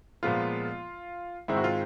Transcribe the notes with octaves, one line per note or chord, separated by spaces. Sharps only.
A#2 F3 G#3 B3 F4
G#2 D#3 G#3 C4 E4
F#4
F4